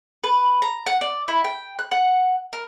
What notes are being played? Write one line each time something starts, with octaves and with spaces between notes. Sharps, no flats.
B4
A#5
F#5
D5
E4
G5
F#6
F#5
A#4